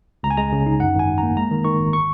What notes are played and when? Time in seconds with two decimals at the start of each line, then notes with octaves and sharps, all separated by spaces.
0.23 C#2 A#5
0.31 G#5
0.37 G#3 A#5
0.52 C#3
0.66 D#4
0.80 F#2 F#5
0.95 G#1
0.99 G#5
1.08 G#1
1.18 A#3 A#5
1.37 G#3 A#5
1.51 D#3
1.64 D#3 C#6
1.79 G#1
1.93 C#6